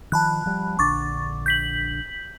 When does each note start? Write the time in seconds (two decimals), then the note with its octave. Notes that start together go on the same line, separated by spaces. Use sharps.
0.12 D#3 F3 A5 B5 F#6
0.46 F3 G3
0.79 A#1 D3 D4 C#6 D6 A6
1.46 G6 B6 F#7